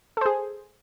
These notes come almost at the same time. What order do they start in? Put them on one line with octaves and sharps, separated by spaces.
A4 C5 G#4